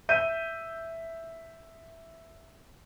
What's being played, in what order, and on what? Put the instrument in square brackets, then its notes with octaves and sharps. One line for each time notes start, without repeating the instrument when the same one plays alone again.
[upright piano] E5 G6 D#7